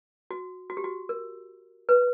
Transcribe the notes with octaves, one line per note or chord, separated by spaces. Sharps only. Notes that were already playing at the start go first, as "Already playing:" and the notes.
F#4
F#4
G4
F#4
A#4
B4